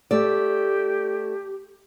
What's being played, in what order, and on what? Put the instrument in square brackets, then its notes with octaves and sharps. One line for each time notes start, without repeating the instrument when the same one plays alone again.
[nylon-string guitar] A3 D5 [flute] G4